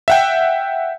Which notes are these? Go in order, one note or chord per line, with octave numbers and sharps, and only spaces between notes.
E5 F#5 G5